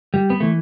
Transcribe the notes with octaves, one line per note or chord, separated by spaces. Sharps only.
G3
B3
E3 A3